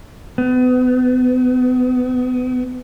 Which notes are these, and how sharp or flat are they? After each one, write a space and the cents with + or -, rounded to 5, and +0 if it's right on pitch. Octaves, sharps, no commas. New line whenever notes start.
B3 +35